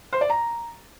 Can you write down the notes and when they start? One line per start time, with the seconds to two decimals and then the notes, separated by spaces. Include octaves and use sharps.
0.13 C5
0.21 D5
0.30 A#5